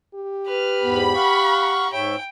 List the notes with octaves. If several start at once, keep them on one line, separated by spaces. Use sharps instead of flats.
G4
B4 F6
E2 G#2 B3 B5
F5 F#5 C#6
G#2 C#5 E5 G5